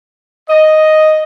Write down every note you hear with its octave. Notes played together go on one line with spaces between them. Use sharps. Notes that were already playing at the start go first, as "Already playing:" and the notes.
D#5